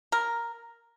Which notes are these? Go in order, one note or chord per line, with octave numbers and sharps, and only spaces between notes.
A#4